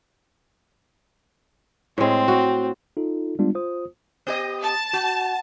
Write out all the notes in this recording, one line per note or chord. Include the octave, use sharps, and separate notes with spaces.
A2 G#3 C4
F#4
D#4 F4 A4
G3 G#3 B3 D4 F4
F4 C5 D#6
B3 G4 D#5
A5
F#4